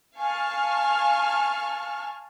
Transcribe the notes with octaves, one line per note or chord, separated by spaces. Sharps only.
F5 G#5 A5 C#6 F6